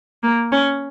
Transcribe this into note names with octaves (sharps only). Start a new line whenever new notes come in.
A#3
C#4